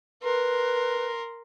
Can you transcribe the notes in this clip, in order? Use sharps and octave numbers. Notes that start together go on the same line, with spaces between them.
A#4 B4 C6